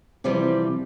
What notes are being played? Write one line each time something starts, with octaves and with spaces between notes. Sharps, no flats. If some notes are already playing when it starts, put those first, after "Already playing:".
C3 E3 F3 G3 C4